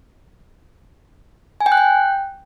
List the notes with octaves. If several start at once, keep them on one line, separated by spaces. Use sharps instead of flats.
G#5
G5
F#6
G5